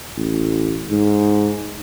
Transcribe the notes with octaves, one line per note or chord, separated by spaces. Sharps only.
A1
G#2